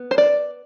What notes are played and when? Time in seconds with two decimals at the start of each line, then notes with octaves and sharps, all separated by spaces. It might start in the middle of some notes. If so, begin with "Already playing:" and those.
Already playing: B3
0.11 C5
0.18 D5